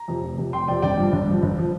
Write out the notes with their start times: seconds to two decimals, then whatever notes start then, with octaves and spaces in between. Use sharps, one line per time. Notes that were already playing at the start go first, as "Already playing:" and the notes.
Already playing: A#5
0.08 F2 C3
0.23 F1
0.38 F2 C3
0.53 F1 G5 C6
0.68 F2 C3 D5 G5
0.82 G1 D5 G5
0.98 G2 F3
1.12 G1
1.28 G2 F3
1.42 G1
1.58 F3